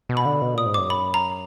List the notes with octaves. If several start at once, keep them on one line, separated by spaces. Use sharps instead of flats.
B2
B5
D3
B2
A#2 D#6
G#2
F#2 D6
B5
A#5